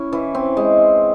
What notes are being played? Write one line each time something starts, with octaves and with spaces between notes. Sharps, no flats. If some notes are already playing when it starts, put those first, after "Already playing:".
Already playing: C#4 E4
E3
C4
G#3